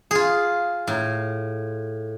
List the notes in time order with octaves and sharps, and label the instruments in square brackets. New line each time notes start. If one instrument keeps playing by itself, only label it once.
[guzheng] F4 G#4
A2